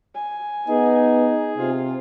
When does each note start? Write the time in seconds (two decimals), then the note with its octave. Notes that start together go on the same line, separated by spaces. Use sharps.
0.15 G#5
0.68 B3 D#4 G#4
1.58 C3 F4